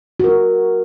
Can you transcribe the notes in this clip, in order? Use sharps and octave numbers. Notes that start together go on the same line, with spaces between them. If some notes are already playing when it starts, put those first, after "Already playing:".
F#4 A#4